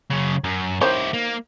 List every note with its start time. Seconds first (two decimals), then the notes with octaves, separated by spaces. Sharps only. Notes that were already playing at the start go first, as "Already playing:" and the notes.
0.10 F#2 C#3
0.44 F#2
0.81 D#3 E4 G4 C5 C#5
1.14 A#3